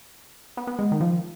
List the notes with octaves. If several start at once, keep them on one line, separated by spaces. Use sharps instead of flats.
B3
B3
G#3
D#3
F3